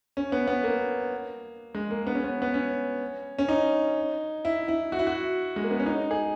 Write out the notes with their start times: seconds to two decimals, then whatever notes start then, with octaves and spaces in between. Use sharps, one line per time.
0.17 C#4
0.32 B3
0.47 B3
0.63 A#3
1.75 G#3
1.91 A#3
2.07 B3
2.15 C#4
2.24 B3
2.42 B3
2.54 C#4
3.39 C#4
3.48 D#4
4.45 E4
4.68 E4
4.92 F#4
4.99 E4
5.07 F#4
5.56 G#3
5.63 A#3
5.71 B3
5.79 C#4
5.86 D#4
6.11 G#4